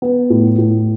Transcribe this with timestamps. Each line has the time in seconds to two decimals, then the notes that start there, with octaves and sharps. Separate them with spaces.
0.02 B3
0.30 A2
0.58 A2